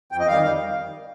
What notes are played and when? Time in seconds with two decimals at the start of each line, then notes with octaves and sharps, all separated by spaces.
0.12 F2 G5
0.20 D#5
0.28 D#3 G3 F5
0.43 F2